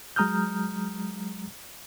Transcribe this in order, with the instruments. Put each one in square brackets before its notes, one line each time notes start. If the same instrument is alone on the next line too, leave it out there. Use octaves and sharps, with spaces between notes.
[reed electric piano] F#3 G#3 A#5 D#6 F6 G6